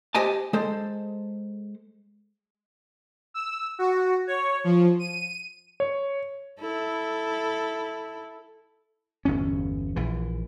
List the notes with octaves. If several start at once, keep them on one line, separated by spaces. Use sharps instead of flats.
G4 C5 D#5 G#5 A5
G#3 A4 C5
E6
F#4
C#5
F3
D#7
C#5
E4 A4
G1 E2 B2 C#4
A#1 E3